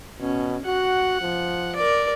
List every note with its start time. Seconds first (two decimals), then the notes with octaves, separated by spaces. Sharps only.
0.20 B2 C#4
0.66 F#4 F#5
1.21 F3
1.76 A#4 D5